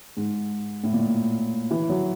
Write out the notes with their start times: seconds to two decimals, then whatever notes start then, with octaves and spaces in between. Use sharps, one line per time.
0.17 G#2
0.84 A2
0.93 A#2
1.71 E3
1.89 F#3